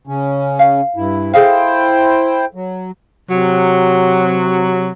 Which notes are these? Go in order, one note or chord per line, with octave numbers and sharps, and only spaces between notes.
C#3 C#4
F5
G2 E4
E4 G#4 A4 C5 F5 G5
F#3
C3 F#3